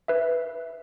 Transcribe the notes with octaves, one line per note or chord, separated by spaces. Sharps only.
B4 E5